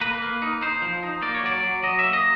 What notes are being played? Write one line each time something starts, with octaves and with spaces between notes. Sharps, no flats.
A#3 B4
A#3
D#4
D#4 C5
F3
D#4
A#3 D5
C#5
F#3 D5
F#3
F#3 D#5
A#3 E5
D#5